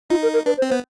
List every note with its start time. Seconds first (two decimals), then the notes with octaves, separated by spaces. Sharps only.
0.10 D#4 F4
0.23 A#4
0.33 A#4
0.46 D4 B4
0.57 C5
0.62 C4
0.69 C5
0.72 B3